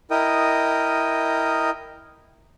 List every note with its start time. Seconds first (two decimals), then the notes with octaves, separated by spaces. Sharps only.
0.11 E4 A#4 D#5 G5 D#6